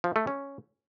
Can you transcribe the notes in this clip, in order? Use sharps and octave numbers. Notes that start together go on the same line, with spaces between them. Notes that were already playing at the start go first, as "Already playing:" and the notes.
F3
A3
C#4